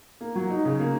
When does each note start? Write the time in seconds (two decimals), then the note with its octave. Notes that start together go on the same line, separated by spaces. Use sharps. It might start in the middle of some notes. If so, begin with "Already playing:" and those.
0.21 A#3
0.35 F#3
0.50 D#4
0.65 C#3
0.80 A#3